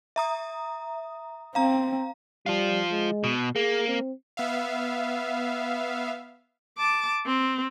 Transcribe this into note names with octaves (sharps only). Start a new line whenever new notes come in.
E5 A#5 D#6
C4 F5 A#5
F3 G3 F4
G#3
B2
A#3 G#4
C4
B3 E5 F5
A5 D6
C4